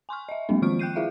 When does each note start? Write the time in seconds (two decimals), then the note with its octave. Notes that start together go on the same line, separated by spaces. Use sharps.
0.09 G#5 C6 C#6 F6
0.29 D#5 E5
0.49 F#3 G#3 A#3 C4 D4
0.62 D#3 F3 F4 C#6 F6 D7
0.79 G5 F#6 G6 C7 D#7
0.95 E4 F4 G#4 E5 F5